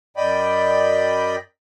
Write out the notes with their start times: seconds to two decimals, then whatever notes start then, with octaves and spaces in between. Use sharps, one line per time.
0.17 F#2 D5 D#5 G5 B5